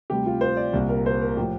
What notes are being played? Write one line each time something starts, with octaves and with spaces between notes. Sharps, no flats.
D2 C3 G3 G4
F4
C5
D5
C2 A#2 G3
A#4
C5
A#4
A2 F3 G4